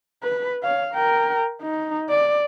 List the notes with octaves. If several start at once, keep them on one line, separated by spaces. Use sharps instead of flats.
B4
C#5 F5
A#4 G5
D#4
D5